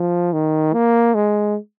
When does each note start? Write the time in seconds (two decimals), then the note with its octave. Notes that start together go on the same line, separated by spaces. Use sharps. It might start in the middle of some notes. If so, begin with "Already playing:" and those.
Already playing: F3
0.33 D#3
0.74 A#3
1.14 G#3